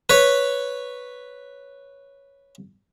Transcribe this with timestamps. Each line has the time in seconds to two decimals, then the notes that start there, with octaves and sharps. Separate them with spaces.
0.09 B4 C#5